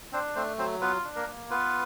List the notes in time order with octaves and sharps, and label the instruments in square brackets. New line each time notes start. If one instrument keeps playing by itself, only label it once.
[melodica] C4 D4 C5
A3 C4 C5
F#3 C4 C5
B3 F4 B4
D4
A#3 A#4
A#3
B3 F4 B4